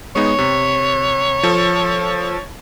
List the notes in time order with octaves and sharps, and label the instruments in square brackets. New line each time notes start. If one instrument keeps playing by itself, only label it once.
[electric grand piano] G#3 B3 D#4 [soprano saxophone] C#5
[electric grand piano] C3
F3 A4